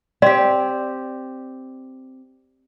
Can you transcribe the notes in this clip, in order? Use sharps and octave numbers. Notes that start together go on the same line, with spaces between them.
C4 G4 D5